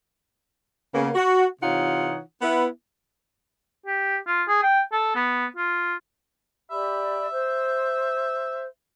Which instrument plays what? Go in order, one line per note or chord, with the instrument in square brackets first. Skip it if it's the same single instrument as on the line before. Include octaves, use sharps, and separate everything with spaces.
[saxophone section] C#3 A#3 B3
F#4
C3 E3 D#4 F4 C#5 F#5
B3 E4 B4
[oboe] G4
F4
G#4
G5
A4
B3
F4
[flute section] G4 D5 B5 [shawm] E5
[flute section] C5